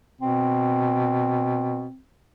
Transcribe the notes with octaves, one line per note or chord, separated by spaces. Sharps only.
B2 C4